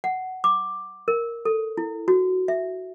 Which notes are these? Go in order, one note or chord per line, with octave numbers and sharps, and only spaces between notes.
F#5
D6
A#4
A4
E4
F#4
E5